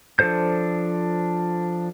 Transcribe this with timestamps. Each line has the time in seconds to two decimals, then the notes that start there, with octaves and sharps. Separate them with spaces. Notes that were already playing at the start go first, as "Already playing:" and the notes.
0.19 F3 D4 A4 C5 G6